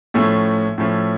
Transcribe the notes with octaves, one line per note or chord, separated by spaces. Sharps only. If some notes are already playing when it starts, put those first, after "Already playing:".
A2 F3 A3 C#4
A2 F3 A3 C#4